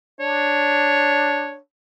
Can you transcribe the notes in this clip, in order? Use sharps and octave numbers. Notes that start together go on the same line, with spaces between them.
D4 C#5